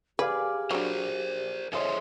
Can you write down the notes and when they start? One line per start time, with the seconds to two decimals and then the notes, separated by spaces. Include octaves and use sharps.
0.19 G4 G#4 B4 D5 F5
0.71 F#3 D4 A#4 C5
1.73 G#4 A4 C5 C#5 D#5 E5 C6